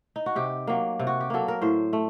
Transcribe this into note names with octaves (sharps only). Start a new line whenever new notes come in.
D#4
F#4
C3 G4
F#3 A#3
C3
F#4
G4
F#3 A#3 A4
A#4
A2 C5
A3